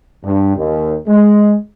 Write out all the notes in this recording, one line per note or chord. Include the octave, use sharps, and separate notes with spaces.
G2
D#2
G#3